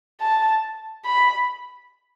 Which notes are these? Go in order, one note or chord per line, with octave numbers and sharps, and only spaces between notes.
A5
B5